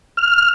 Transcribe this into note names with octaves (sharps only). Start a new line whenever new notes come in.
F6